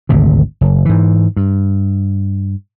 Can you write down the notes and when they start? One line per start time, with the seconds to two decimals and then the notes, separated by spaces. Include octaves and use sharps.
0.09 G#1 D2 C3
0.61 F#1
0.85 G#2 E3
1.36 G2